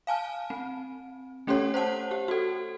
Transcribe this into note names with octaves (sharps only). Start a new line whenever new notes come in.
F5 G#5 A5 F6
C4
A3 C#4 G4 A4 C#5 F#5
C5 C#5 F#5 A5
G4
F#4 A4